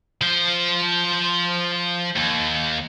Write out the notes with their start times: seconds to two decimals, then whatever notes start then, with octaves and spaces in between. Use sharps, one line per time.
0.21 F3 C5
2.16 D#2